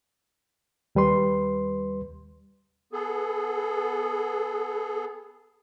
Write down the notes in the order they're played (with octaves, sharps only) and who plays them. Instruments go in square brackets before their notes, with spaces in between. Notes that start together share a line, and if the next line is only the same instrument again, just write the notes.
[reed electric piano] D#2 G3 B4 C6
[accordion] B3 G#4 A4